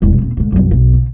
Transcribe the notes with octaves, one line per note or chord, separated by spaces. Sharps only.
E1 C2
D#1 C4
D2 G#2
C2 F#2
B1
C#3